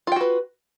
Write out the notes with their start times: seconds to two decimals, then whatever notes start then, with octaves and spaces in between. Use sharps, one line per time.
0.07 F4
0.12 G5
0.16 F#4
0.21 B4